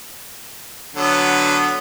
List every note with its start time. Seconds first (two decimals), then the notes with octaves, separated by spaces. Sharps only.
0.95 D3 F#3 B3